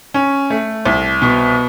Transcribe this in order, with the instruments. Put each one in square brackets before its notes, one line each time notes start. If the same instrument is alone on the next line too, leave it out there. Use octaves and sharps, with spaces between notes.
[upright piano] C#4
A3
C2
B2